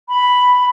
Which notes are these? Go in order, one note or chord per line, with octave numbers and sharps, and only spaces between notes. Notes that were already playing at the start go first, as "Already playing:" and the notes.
B5